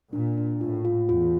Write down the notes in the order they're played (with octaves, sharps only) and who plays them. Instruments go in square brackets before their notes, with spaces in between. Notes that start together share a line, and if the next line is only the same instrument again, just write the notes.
[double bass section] A#2 [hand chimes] D4
[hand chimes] D4
[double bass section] A2 [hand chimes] F4
[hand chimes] F4
[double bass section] E2 [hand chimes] F4